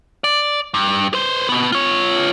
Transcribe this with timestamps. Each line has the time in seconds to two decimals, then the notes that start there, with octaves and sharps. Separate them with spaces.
0.24 D5
0.74 G2
1.14 B4 C5
1.49 B2 B3
1.72 F4 C#5